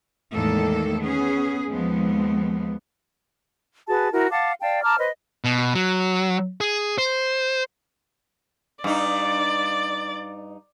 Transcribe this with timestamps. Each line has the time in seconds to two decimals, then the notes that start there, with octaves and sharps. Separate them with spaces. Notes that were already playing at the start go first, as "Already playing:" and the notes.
0.33 E2 A2 D#3 G#3 A#3 A4
1.02 B3 C#4 G#4
1.70 D#2 F3 G#3 B3
3.88 F#4 G#4 B4 A5
4.11 E4 F#4 A#4
4.30 F5 F#5 A5 D6
4.61 D5 F5 G5 A5
4.83 A5 A#5 D6 F6
4.98 B4 C5 D#5
5.44 B2
5.75 F#3
6.61 G#4
6.98 C5
8.84 G2 D#4 D5